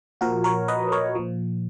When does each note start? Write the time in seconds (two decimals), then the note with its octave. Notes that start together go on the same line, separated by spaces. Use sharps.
0.21 A#2 F3 F#4 A#4
0.44 A#4 C#5
0.68 B4 D#5
0.92 A#4 C#5
1.15 A#2 F3